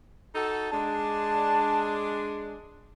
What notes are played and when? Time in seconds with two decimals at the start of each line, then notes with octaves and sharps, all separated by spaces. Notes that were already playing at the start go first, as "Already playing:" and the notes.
0.35 D#4 F#4 A4
0.72 G#3 D4 A5